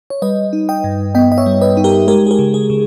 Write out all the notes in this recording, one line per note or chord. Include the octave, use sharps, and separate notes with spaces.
C#5
G3 B4 D#5
D#4
D#5 G5
G2
B3 D#5 G5
D#5
C#5 E5
G3
B4 D#5
D#4
G4 A#4
G#3 G4 A#4
G#4
G4 A#4
C#3
G#4
C#3